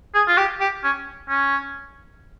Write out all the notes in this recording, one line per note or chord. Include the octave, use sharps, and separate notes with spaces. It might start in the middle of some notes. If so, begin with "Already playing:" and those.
G#4
F4
G4
G4
C#4
C#4